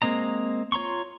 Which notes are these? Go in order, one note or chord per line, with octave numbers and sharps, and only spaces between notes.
G#3 A#3 C4 D#5 A#5
F4 C#5 A#5 C6 C#6